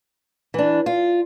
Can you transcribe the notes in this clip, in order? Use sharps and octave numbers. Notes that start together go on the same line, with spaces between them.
E3 D4
F4